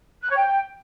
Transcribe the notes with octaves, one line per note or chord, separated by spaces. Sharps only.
F#6
C#5
G5